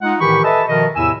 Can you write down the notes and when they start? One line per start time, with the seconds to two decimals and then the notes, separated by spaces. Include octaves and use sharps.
0.02 G#3 D#4 F4 F#5
0.20 A2 D#3 E3 G4 B5 C#6
0.44 A4 B4 D#5 E5 G#5 A5
0.68 B2 D#3 F3 A#4 D#5
0.96 E2 A2 C3 E4 G#5 E6